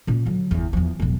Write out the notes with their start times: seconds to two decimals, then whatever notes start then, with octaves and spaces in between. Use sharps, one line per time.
0.07 A#2 C#4
0.26 D3 F#3
0.51 G1 E2
0.73 E2 F3
1.00 E1 B1